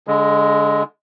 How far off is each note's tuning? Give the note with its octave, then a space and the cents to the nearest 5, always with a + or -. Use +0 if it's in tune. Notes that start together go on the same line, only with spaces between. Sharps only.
D3 -30 G#3 +0